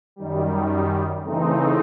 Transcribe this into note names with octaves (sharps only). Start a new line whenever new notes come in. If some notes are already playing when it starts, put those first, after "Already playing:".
F#2 D#3 G3
C#3 E3 A3 C4 D#4